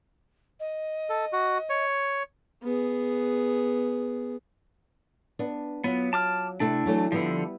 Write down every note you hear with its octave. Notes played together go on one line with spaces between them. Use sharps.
D#5
A4
F#4
C#5
B3 G#4
B3 D4
F#3 B3 F4
A5 D6 F6
C3 A3 D4 E4
E3 F#3 A3
D3 F3 G3 B3 E4